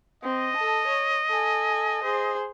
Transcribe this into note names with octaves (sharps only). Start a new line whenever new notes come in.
C4 D#5
A4 A5
C#5
A4 G#5
G#4 C5